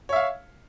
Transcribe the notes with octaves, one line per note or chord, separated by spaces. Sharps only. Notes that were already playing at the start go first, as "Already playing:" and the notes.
C#5 E5 F5